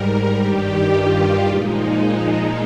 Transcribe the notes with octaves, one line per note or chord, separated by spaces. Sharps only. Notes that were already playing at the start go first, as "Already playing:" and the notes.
Already playing: G#2 G3 A#4
G2 D#3 G3 G4
F4
A#2 F3 G#3 D#4